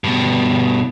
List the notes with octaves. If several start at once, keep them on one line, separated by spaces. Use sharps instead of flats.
G2 B2